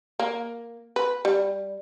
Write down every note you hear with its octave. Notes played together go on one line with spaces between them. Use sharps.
A#3
B4
G3